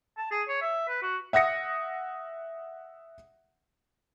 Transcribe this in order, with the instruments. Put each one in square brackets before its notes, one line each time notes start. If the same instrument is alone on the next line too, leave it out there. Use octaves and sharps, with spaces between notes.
[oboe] A5
G#4
C#5
E5
B4
F#4
[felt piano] E5 F#5 D#6 A#6 C#7